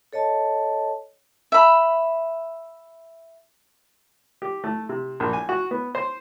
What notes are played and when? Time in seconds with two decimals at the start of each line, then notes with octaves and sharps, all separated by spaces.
0.13 A4 C#5 D#5 A5
1.52 E5 B5
4.42 G4
4.64 A3
4.89 C3
5.20 A#1
5.33 G#5
5.49 F#4
5.71 B3
5.95 C5